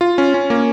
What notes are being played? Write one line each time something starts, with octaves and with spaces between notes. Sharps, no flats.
F4
C#4
C#4
A#3